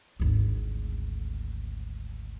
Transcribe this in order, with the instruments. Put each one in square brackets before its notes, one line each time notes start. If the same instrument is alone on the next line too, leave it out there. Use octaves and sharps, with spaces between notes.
[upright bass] G#1 D2